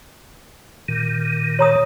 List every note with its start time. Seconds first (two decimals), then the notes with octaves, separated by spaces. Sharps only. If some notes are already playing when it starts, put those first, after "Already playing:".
0.88 A#2 D#3
1.59 C#5 A#5 D#6